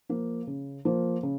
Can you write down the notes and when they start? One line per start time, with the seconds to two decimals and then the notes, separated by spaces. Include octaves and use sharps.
0.09 F3 A#3
0.47 C#3
0.85 F3 A#3
1.23 C#3